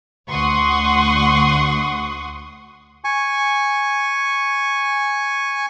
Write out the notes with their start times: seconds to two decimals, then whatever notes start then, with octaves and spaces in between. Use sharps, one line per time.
0.29 D2 F#5 C6 C#6 D#6
3.04 G#5 C#6